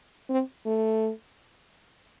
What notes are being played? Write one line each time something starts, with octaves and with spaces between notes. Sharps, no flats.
C4
A3